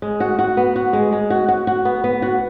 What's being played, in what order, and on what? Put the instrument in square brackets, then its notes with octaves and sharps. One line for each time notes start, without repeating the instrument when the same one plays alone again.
[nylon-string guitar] G#3
F#4
F#4
B3
F#4
G#3
G#3
F#4
F#4
F#4
B3
B3
F#4